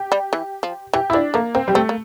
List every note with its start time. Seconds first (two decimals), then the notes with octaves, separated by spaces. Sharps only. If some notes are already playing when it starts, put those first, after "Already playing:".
Already playing: G4
0.12 G3
0.33 E3
0.63 F3
0.93 E3 G4
1.10 E4
1.13 F3 D4
1.34 A3 A#3
1.55 A#3 C4
1.68 G3
1.75 A3 C4
1.89 A#3